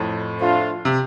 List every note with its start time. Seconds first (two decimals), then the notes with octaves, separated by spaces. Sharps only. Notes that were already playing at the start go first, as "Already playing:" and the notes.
Already playing: F2 A2
0.38 F3 A3 D4 F4
0.85 C3